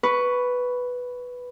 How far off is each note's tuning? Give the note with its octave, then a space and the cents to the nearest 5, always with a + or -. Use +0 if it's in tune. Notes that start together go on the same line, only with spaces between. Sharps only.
B4 +0 C#6 +10